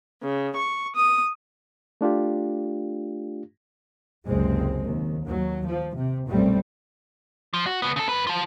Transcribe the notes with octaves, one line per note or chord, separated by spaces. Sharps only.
C#3
C#6
D#6
A3 D4 F4 G4
F#1 C#2 C3 G#3 C4
D#2
D#2 F#3
F3
C3
B1 F#2 A#2 G3 A3 C4
F3
F#4
C#2 B3
C#3 A4
F#2 B4
F4 A5